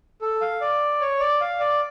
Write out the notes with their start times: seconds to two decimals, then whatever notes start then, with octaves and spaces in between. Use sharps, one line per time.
0.22 A4
0.41 F5
0.61 D5
1.01 C#5
1.20 D5
1.41 F5
1.60 D5